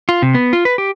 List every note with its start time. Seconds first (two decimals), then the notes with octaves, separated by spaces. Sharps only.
0.09 F4
0.22 C3
0.35 B3
0.53 F4
0.65 B4
0.78 G4